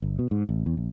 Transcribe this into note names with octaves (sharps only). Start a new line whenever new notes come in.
G1
B2
G#2
A1
E2
A#1